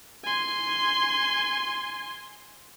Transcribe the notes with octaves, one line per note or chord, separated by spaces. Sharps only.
G#5 C6